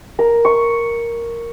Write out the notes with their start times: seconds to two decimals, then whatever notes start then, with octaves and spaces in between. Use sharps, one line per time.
0.19 A#4
0.45 C#6